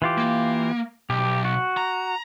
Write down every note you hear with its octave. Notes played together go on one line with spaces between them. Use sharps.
E3 F4 G4
A#3
B1 G4
F#4
A#5